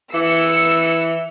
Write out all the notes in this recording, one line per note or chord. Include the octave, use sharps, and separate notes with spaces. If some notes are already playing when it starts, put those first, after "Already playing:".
E3 E6 C#7